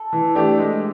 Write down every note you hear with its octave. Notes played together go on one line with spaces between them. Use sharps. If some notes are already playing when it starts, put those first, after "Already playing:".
Already playing: A4
E3
A3 D4 G4
G#3